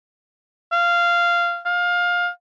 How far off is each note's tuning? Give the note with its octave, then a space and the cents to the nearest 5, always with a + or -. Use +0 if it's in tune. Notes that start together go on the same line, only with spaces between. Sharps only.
F5 -15
F5 +20